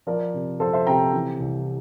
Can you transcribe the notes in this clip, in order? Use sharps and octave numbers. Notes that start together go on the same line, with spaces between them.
F3 A#4 D5
C3
F3 A4 C5
C5 E5
C3 G5 A#5
E3
C2